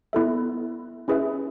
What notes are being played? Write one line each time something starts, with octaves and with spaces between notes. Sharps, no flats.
B3 E4 A4 E5
C#4 E4 G#4 B4 E5